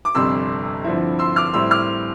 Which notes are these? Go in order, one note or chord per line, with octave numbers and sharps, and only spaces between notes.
D6
G1 F2 C3 G3 C6 E6
G2 D3 F3 C4 E4
C6 E6
D6 F6
A2 G3 C4 E4 C6 E6
D6 F6